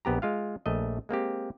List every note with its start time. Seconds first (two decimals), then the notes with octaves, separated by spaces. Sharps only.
0.05 A#1 B3 G4 A#5
0.22 G#3 F4 F5
0.66 A#1 A3 D#5
1.09 G#3 A#3 C4 G4